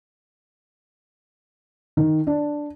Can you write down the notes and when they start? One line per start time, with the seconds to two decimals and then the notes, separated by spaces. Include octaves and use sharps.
1.97 D#3
2.27 D4